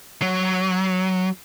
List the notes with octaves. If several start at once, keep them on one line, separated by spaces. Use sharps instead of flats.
F#3